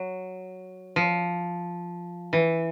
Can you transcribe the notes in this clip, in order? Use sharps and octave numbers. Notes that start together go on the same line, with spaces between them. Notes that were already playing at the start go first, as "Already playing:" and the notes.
Already playing: F#3
F3
E3